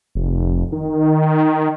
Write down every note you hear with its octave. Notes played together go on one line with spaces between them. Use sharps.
F1
D#3